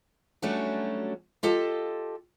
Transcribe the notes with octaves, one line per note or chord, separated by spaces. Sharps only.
F#3 G3 A3 C#4 D4 F#4
F4 G4 A4 D#5 A5